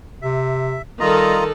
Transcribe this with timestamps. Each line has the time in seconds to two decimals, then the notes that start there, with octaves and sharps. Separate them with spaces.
0.22 C3 E5
1.00 D#3 G3 F4 A4 D#5 A#5